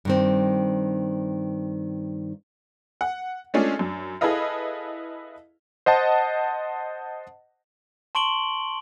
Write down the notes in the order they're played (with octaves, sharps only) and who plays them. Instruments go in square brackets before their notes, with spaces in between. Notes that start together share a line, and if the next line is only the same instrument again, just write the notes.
[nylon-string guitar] G2 D#3 C4
[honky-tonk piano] F#5
G#3 A3 C#4 D4 F4 G#4
F#2 D4
E4 G#4 A4 B4 D#5 F5
[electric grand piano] C5 D#5 F#5 A5
[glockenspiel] A5 C6 C#6 D7 F#7 G7